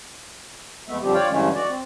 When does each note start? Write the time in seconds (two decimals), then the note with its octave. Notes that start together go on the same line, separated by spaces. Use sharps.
0.88 F2 G#3 A3 B3 E5
1.02 F2 D3 F3 G3 C4 G4
1.14 F4 C#5 D5 F5 G5
1.30 G2 D3 E3 G#3 A3 C#4
1.55 F#4 D5
1.69 C4